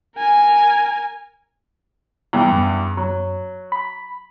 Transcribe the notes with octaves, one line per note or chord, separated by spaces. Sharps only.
A#4 G#5
E2 G2
F#2
F#3
B5